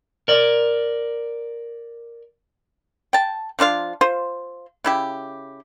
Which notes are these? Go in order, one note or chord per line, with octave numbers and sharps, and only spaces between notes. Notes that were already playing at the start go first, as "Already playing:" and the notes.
A#4 D5
G5 A5
F3 D4 F4 F5
F4 C5
C#3 E4 G4